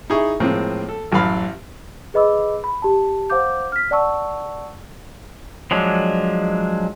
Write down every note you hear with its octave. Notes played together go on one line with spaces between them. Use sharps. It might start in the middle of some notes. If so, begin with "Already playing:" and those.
D#4 E4 G#4 C#6
A2 F3 G#3 A#3 C4
A4
A1 F#2 B4 F5 B5
G#4 B4 D#5 B5 D6 E6
B5
G4 A5
C5 F5 F#5 D6 G6
F6 B6
D5 F#5 A5 C#6 E6
F3 F#3 G#3 D4